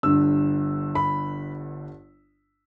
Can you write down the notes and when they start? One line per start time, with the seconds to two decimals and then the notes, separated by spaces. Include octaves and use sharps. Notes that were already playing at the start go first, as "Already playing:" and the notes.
0.03 G1 G2 D3 E6
0.95 B5